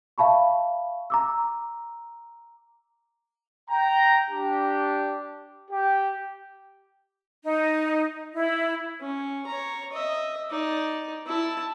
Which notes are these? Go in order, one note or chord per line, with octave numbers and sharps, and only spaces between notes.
E5 F5 A5 B5 C#6
A#5 D6 E6
G5 A#5
D4 G4
G4
D#4
E4
C#4
C#5 A#5
D#5 E5
D#4 D5
E4 A5